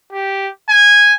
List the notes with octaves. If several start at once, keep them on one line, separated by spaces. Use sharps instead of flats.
G4
G#5